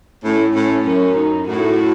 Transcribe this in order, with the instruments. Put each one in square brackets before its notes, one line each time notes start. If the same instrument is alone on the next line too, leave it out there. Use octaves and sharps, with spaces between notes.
[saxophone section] A2 [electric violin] C#4
[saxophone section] A2 [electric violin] C#4
[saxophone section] F#2 [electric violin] C#4
[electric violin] D#4
[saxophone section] A2 [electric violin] F#4